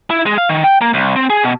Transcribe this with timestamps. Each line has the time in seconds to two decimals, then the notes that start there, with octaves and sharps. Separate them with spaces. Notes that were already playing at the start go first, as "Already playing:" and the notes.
0.10 E4
0.26 G#3
0.38 F5
0.49 D#3
0.64 G5
0.81 A#3
0.94 C2
1.16 C4
1.30 G#4
1.43 B2